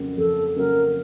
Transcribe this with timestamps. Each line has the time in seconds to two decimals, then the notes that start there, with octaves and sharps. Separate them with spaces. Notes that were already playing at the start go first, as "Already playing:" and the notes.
Already playing: F2 C#3 F#3 A#3
0.17 F2 A4
0.56 C#3 F#3 A#3 A#4